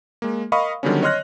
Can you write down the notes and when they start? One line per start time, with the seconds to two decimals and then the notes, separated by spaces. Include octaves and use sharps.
0.22 G#3 A#3
0.52 A#4 D#5 F5 B5 C#6 D#6
0.83 D3 D#3 F#3 G3 B3 C#4
1.02 C#5 D#5 C6 F6 F#6 A#6